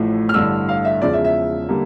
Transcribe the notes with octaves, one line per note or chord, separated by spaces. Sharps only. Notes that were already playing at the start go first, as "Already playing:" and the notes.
Already playing: A1 A2 F3 A3
F6
A1 G2 D3 E6
F5
E5
E1 E2 C#3 F3 D5
E5
E5
D3 G3 A#3